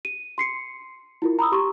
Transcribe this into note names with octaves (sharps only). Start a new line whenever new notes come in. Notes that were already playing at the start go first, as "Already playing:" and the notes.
D#7
C6 C7 C#7
E4 F4 A#4
A#5 B5 D#6 E6
G4 C6 C#6